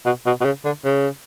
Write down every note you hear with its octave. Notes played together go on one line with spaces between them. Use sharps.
B2
B2
B2
C#3
D3
C#3